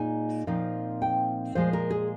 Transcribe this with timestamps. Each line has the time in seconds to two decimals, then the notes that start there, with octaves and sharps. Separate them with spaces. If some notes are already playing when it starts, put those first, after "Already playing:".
Already playing: A#2 G#3 D#4 G#5
0.47 A#2 F3 C4 D#4
1.02 G5
1.55 A#2 F3 G#3 C5
1.73 A#4
1.90 G#4